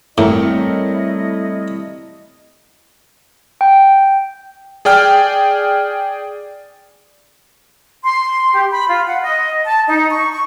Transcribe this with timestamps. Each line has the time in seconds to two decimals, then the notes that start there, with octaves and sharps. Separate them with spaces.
0.18 A2 G3 A3 C4 E4 A#4 C#5 D#5
3.61 G5
4.85 G#4 D5 G5 F6
8.04 C6
8.55 G4
8.71 B5
8.88 F4
9.08 F#5
9.22 D#5
9.67 A5
9.88 D#4
10.10 C#6
10.31 C#6